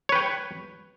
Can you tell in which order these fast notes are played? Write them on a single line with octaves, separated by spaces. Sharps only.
C#5 B4 G5